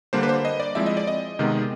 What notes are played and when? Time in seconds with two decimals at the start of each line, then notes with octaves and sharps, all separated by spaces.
0.13 D3 G3 A#3 D4 C5
0.23 B4
0.29 C5
0.45 D#5
0.60 D5
0.75 F3 G#3 C4 E4 E5
0.86 D#5
0.97 D5
1.07 D#5
1.39 C3 D#3 G#3 B3